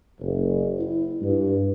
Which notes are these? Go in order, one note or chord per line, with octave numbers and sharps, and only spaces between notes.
F#1
E4
G2